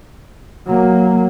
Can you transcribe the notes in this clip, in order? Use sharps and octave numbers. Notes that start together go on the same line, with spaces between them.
F#3 A#3